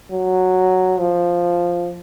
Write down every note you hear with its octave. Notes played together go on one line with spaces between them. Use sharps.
F#3
F3